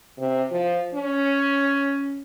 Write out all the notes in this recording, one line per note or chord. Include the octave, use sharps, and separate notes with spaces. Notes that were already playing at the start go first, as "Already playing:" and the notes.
C3
F3
C#4